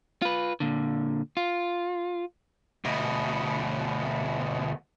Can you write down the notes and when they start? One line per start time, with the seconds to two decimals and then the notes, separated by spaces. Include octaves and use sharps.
0.22 F4 B4
0.60 A#2 D3
1.37 F4
2.85 D2 B2